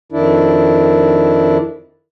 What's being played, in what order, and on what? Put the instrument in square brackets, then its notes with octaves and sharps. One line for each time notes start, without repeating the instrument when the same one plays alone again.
[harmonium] F2 D#3 D4 E4